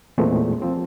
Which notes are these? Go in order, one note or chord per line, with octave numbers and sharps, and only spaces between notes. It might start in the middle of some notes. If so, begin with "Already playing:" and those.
E2 A#2 E3 G#3 A3 C4
F3 C4